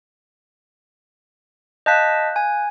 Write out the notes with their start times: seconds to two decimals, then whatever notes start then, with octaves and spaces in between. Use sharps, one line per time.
1.86 D#5 F5 A5 F#6 G6 B6
2.36 G#5